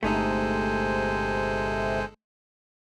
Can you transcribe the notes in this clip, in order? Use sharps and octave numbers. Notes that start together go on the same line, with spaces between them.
G1 C3 G#3 A3 D#4 A4 C5 G#5